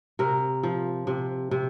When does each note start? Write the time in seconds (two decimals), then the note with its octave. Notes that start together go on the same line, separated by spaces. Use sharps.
0.19 C3 A#4
0.63 F3
1.07 C3
1.51 C3